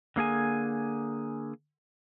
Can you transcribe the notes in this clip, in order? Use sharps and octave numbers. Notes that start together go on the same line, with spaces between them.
D3 A#3 G#4 G#5